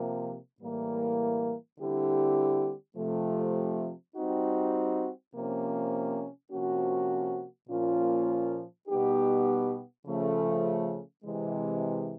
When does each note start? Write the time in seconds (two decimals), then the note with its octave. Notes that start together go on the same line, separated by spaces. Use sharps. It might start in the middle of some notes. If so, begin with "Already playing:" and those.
Already playing: C3 F3 A#3
0.60 A2 E3 G3 A#3
1.79 D3 G3 C4 E4 G4
2.97 C3 F3 A3
4.16 G3 C4 D#4 F#4
5.34 C3 F3 A#3 C#4
6.52 C3 F3 A#3 C#4 F#4
7.69 A#2 F3 A#3 C#4 F4
8.88 B2 G3 B3 D#4 G4
10.06 C#3 F3 A3
11.24 C3 E3 G#3